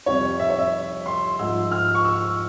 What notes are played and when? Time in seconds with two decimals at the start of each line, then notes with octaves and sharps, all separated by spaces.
0.06 F2 C3 G3 C#5
0.39 E5
0.50 C#5
0.59 E5
1.06 C6
1.39 G#2 F3 E6
1.72 F6
1.95 C#6
2.05 E6